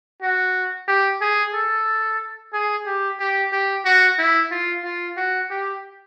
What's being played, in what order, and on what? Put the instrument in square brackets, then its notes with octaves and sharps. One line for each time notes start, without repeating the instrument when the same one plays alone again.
[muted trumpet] F#4
G4
G#4
A4
G#4
G4
G4
G4
F#4
E4
F4
F4
F#4
G4